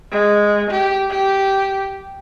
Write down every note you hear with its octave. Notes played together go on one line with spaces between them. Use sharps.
G#3
G4
G4